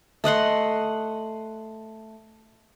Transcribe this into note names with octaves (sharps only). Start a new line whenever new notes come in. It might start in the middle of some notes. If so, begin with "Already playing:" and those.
A3 D#5 F#5 C6